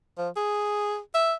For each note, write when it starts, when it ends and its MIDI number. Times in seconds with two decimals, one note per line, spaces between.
0.18 0.29 53
0.36 0.99 68
1.14 1.34 76